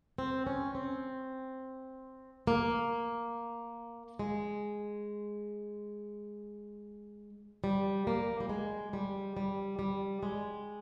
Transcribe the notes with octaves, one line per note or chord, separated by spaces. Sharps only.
C4
C#4
C4
A#3
G#3
G3
A#3
G3
G#3
G3
G3
G3
G#3